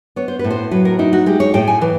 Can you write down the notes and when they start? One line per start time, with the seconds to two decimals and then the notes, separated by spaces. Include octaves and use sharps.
0.16 B3 C#5
0.28 C5
0.39 B4
0.44 A2
0.50 C5
0.71 F#3 B4
0.85 A#4
0.99 D#4 E4
1.13 F#4
1.26 G#3 G4
1.40 C#5
1.54 A2 G5
1.67 G#5
1.81 E3